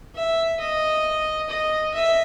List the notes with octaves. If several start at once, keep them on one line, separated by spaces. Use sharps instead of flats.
E5
D#5
D#5
E5